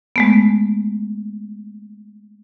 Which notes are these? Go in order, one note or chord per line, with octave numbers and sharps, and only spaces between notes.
G#3 A3 B3